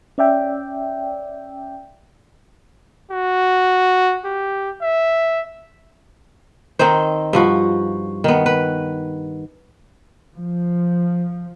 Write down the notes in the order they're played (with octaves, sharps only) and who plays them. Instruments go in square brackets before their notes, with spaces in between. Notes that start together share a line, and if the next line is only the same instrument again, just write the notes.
[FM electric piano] C#4 D5 E5 G5
[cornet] F#4
G4
E5
[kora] D#3 C4 D#4 C5
G2 F3 F#4
D#3 B3
B4
[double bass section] F3